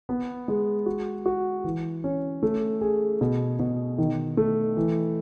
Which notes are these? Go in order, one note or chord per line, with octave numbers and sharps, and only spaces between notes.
B3
G#3
F#4
F#4
E3
C#4
A3
G#4
B2
B2
D#3
A3
E3